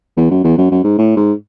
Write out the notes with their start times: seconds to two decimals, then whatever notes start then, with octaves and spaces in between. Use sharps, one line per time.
0.17 E2
0.31 F#2
0.44 E2
0.57 F#2
0.71 F#2
0.84 G#2
0.98 A2
1.17 G#2